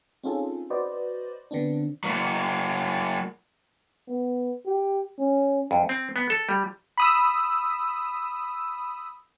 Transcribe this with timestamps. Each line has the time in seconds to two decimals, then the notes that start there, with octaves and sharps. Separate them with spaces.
0.23 C4 C#4 D#4 F4 G#4 A4
0.70 F#4 B4 C5 D5 D#5
1.51 D3 B3 C4 D4
2.04 F#3 A#3
4.08 B3
4.66 G4
5.19 C#4
5.71 F2
5.89 C4
6.16 B3
6.30 A4
6.49 G3
6.97 B5 D#6 E6